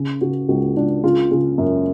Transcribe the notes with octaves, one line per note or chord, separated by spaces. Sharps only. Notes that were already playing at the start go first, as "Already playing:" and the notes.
Already playing: C#3
C#3 F#4
C#2 F#4
C#2 D4
C#3 F4
C#3
F#2